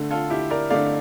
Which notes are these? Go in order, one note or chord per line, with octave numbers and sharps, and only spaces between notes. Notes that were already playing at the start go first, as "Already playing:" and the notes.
Already playing: D3 A3
F4 A4
E4 G4
A#4 D5
D3 A3 D5 F5